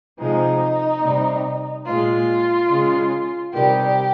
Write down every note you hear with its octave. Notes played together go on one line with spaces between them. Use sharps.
C3 F3 G#3 D#4
C3 G3
A#2 G#3 F4
C#3 G#3
C3 D#3 G3 G4